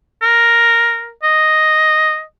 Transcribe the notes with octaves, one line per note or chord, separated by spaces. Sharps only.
A#4
D#5